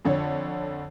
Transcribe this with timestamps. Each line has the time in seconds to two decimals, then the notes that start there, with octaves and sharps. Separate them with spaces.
0.05 F2 D3 C#5